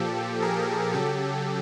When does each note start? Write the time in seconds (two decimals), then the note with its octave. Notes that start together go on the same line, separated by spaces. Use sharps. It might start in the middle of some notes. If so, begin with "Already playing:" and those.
Already playing: A#2 F3 G4 A4
0.42 G#4 A#4
0.93 C#3 F#3 G4 A4